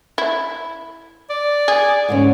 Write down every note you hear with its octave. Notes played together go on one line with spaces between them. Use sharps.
E4
D5
G#4
G#2 D3 C#4